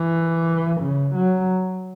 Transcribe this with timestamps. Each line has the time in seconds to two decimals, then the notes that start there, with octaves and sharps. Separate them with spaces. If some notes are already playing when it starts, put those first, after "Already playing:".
Already playing: E3
0.81 C#3
1.15 F#3